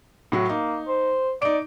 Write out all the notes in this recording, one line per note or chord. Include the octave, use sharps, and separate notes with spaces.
A2 F#3 F#4
A#3 D#4
C5
D#4 D5 D7